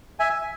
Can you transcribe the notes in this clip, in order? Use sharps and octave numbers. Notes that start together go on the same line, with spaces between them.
E5 G#5